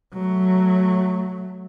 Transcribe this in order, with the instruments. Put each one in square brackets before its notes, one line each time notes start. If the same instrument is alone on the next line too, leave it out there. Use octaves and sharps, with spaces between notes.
[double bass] F#3 A3